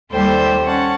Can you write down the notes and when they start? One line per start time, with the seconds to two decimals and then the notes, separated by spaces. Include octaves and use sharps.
0.12 D#2 G3 A4 C5 G5
0.64 C#4 F#5 A5